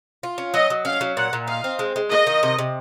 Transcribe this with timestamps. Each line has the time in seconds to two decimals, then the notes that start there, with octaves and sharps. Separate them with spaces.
0.23 F4
0.38 C#4
0.54 F#3 D#5
0.70 F#3
0.85 C#4 F5
1.01 F#3
1.17 A#2 F#5
1.33 A#2
1.48 D#4 F5
1.64 C4
1.79 G#3
1.96 G#3
2.11 A#3 D#5
2.27 D#3
2.43 C3
2.58 C3